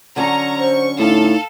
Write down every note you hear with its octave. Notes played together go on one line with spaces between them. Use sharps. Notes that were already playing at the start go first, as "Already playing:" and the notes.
D3 F#3 C#4 A#5 C#6
C5 C#6
A2 D#4 A4 F5